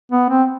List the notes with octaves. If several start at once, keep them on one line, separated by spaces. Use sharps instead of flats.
B3
C4